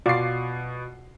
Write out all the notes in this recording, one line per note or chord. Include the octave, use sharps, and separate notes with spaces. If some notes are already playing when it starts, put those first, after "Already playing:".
B2 F4 F#4 D5 C7